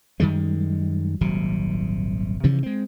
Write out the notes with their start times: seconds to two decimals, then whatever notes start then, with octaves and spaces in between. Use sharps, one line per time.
0.20 F#2 D#3 G3 G#3
1.21 D#1 G#1 C3 F#3
2.44 G2 C3 E3 F3
2.63 G#3 C4